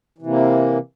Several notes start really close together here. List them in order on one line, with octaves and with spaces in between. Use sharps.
E3 C3 A#3